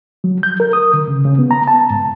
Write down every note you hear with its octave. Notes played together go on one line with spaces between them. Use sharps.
F#3
G6
A#4
D#6
D3
C#3
C#3
B3
A#5
A5
G#2